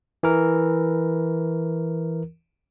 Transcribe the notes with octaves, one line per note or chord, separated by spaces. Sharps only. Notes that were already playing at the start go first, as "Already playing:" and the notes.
E3 A#4